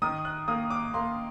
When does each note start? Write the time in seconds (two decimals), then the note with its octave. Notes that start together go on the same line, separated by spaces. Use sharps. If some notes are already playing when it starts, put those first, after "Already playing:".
0.02 D#3 D#6
0.25 F#6
0.48 A#3 D#6
0.70 D6
0.94 A#3 C6